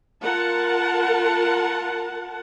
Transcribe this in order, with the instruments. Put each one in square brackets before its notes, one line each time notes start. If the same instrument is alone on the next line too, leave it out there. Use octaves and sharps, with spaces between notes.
[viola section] F4 A#4 F#5 A5